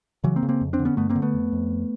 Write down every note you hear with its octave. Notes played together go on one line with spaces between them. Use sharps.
C#3 E3 F#3
A#3 C4
C#3
A#3 C4
F2
C4 D4
D3
B3 C#4
G2 A3 B3
A#3 C4
D3
A3 B3
F2
F2